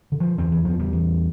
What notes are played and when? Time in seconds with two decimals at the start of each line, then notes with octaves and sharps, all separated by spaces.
0.12 D3
0.20 F3
0.38 E2 C4
0.52 E3
0.65 E2 F3
0.79 G3
0.93 E2